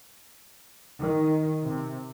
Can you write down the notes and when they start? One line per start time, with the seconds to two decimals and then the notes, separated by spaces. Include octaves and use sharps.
1.00 D#3
1.68 C3